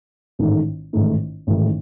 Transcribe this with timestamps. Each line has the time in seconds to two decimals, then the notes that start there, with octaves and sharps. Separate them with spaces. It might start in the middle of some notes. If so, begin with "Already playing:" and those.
0.39 A1 G#2 D#3 A3 D#4
0.93 A1 G#2 D#3 A3 D#4
1.47 A1 G#2 D#3 A3 D#4